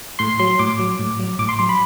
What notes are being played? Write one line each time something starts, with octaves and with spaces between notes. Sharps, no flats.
A2 C6
F#3 C6
A2 D6
F#3
A2
F#3
A2 D6
C6
F#3 C6
B5